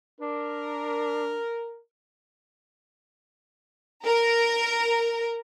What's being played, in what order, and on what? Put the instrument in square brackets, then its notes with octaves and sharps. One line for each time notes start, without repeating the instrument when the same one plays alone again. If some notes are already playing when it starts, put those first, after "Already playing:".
[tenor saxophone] D4 [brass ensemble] A#4
[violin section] A#4